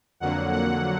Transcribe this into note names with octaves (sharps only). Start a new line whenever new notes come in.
F2 D3 F#3 A#3 F#5
F#5